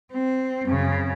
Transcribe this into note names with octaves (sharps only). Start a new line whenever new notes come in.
C4
F#2 C#3